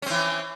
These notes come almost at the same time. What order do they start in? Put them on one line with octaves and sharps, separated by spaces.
C#4 C4 E3